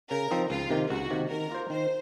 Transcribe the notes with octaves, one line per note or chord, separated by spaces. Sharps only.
C#3 A#4
F3 C4 D#4
C#2 F4
C3 D#3 A#3
C#2 F#4
C3 D#3 A#3
D#3 A#4
A#3 F4 C5
D#3 C5